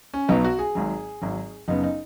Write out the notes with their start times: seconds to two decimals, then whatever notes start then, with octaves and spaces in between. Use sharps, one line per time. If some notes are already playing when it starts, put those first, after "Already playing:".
0.14 C#4
0.28 B1 B2 F#3 B3 D#4
0.44 F#4
0.59 G#4
0.75 G#1 G#2 F#3
1.22 G#1 G#2 F#3
1.68 F#1 F#2 C#3 B3 D#4
1.84 D#4